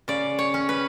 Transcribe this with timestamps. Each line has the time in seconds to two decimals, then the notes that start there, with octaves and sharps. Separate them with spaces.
0.08 C#3 D5
0.39 C#5
0.54 C#4
0.69 B4